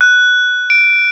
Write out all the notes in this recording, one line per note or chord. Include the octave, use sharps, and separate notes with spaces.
F#6
D7